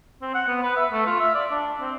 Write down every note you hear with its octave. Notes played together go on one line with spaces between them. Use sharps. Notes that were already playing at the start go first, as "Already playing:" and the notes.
C4
F#5
B3
B4
E5
A3
F4
E5
D5
D4
C4